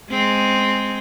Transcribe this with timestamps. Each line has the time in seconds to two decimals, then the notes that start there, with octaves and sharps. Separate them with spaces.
0.10 G#3 C4